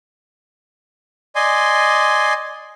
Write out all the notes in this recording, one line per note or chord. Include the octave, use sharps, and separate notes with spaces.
D5 D#5 G#5 C6